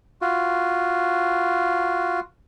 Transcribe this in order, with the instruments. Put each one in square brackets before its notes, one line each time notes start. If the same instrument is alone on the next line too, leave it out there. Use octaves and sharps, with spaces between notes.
[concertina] F4 F#4